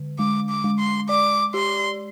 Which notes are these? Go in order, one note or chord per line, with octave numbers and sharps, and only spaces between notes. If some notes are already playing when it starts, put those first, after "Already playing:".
Already playing: D3
G#3 D6
D6
G#3
C6
D5 D6
G4 C6